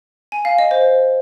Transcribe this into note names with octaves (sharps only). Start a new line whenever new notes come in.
G#5
F5
D#5
C5